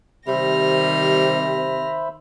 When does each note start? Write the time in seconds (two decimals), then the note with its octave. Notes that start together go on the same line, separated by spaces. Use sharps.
0.28 C3 D#3 G3 C5 E5 B5 F6 A#6